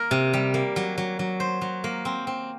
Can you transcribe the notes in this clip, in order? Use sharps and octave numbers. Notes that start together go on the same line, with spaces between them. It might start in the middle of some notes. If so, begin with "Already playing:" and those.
Already playing: A#3 A#4
C3
G3
A#3
F#3
F#3
F#3
C5
F#3
A#3
C4
C4